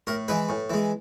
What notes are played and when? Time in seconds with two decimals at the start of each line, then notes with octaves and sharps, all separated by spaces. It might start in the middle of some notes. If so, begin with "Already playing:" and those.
0.07 A2 A#4
0.28 E3 G#3 B4
0.49 A2
0.70 E3 G#3